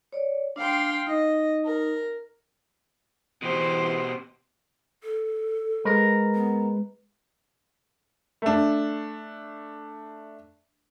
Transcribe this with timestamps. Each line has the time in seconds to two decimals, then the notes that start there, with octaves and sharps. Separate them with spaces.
0.13 C#5 D5
0.56 D4 F5 G5 C6
1.07 D#4 D#5
1.65 A#4
3.42 B2 E3 G4 C5
5.03 A4
5.85 G#3 A#4 B4
6.34 B3
8.42 A3 D4